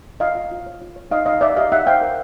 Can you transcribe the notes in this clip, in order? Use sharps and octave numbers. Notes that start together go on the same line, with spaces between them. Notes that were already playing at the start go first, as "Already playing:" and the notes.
F4 D#5 F5
F4
F4
C#5
F4
C#5
D#4 D#5 F5
D#4 D#5 F5
D#4 D5 E5
G4 D#5 F5
D#4 E5 F#5
C5 F5 G5
A#4